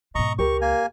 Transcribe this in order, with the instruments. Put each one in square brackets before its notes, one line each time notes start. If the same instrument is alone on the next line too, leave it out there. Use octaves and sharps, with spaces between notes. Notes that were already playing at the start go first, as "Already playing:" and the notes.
[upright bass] G#2 B2 [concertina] D#5 A#5 C#6
[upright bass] C#2 [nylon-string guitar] G4 A#4 [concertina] C#6
[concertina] A#3 G#5